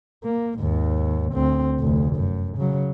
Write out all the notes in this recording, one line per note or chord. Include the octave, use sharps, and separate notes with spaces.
A#3
D#2 G#2
D2 C4
F1 D2
F#2
C#3 F#3